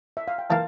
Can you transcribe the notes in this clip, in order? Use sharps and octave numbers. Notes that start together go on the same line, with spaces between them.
E5
F5
G5
E3 A#3 F5 A5